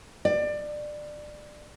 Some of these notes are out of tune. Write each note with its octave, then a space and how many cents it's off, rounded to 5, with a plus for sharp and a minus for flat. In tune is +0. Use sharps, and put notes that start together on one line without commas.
D5 +20